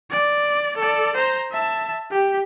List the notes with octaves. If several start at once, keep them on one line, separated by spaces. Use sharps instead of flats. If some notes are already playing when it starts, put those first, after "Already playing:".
D5
A4 D5
C5 A#5
E5 A5
G4